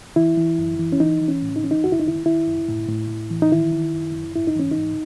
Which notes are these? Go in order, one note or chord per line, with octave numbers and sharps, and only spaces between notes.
E3 E4
E3
F#2
E3
C#4
E3 D#4
E3
C#4
A2
D#4
E3 C#4
D#4
F#2 F#4
E4
D#4
D#3 E4
D#3 E4
F#2
A2
A2
A2
E3
D#4
D#3 E4
D#3
F#2
F#2
G#2 E4
D#4
E3 C#4
D#4
G#2